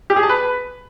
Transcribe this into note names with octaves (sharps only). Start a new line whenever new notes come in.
G4
G#4
A5
B4